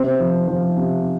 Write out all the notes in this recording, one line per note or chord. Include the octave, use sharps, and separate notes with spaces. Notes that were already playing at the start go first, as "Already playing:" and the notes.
Already playing: C3 C4 C5
F3
F3
C3